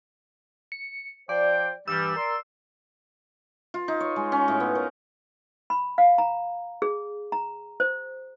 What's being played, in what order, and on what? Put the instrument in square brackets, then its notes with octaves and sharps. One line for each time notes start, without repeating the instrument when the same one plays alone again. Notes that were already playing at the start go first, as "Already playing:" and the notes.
[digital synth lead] C#7
[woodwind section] F3 C5 G5 [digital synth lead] D5
[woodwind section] G2 E3 G3 [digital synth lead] E6
[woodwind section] A#4 D5 C6
[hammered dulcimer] F4
D#4
C#5
G#3
C#4
A2
B3
A#4
[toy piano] B5
F5
A#5
G#4
A#5
C5